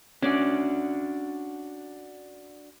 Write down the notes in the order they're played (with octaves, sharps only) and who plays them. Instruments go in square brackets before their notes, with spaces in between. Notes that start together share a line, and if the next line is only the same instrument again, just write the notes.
[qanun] C#4 D5 [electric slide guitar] D4 F#4